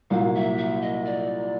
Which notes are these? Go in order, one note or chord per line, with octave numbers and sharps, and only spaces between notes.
C2 A#2 F#3 A#3 F5
E5
E5
D#5
D5